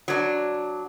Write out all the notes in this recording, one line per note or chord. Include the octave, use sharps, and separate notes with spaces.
F#3 D4